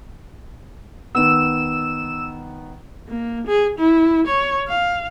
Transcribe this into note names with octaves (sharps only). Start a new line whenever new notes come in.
D#3 B3 E6 E7
A#3
G#4
E4
C#5
F5